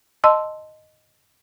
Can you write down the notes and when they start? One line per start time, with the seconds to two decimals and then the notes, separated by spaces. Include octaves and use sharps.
0.24 D#5 A5 C6 E6